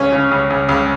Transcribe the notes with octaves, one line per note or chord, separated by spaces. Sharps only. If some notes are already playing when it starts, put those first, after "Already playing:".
Already playing: C#2 C#4
C#3
C#2
C#2
C#2